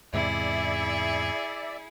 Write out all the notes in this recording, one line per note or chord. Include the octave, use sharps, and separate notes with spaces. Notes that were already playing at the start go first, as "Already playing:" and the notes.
E2 G#2 C3 E4 G#4 D5 E5